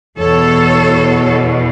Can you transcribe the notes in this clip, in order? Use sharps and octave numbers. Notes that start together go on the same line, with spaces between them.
E2 B2 A4 C#5